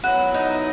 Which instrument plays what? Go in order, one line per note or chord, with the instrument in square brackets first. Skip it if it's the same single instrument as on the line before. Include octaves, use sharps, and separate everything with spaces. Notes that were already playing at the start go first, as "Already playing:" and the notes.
[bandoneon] F#3 B3 E4 [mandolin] F#4
[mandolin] D#4